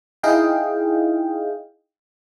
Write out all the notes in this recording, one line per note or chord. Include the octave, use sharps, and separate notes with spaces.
D#4 E4 G#4 D#5 F5 G5